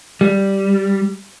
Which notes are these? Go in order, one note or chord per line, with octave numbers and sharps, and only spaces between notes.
G3